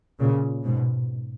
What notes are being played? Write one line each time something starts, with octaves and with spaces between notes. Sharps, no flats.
A#2 C#3
G#2 B2